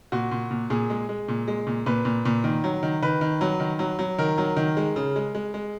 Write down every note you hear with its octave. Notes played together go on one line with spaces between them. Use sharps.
A#2 F#4
A#2
A#2
A#2 G#4
G#3
G#3
A#2
G#3
A#2
A#2 B4
A#2
A#2
D#3
F#3
D#3
D#3 B4
D#3
F#3
D#3
F#3
F#3
D#3 A#4
F#3
D#3
G#3
C#3
G#3
G#3
G#3